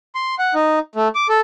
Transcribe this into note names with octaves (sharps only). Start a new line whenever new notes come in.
C6
F#5
D#4
A3
D6
A4